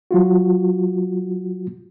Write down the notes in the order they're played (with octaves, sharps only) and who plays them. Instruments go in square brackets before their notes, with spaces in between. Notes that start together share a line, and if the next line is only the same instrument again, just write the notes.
[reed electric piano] F#3 F4 F#4